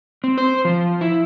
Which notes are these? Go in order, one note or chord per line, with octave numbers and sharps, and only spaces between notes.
C4
C5
F3
E4